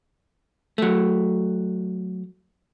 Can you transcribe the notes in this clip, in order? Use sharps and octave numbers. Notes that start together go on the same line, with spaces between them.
F#3 A3